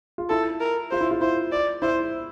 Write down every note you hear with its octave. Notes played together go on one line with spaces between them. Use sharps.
F4
E4 A4
A#4
F4 C5
E4
F4
E4 C5
D5
E4 C5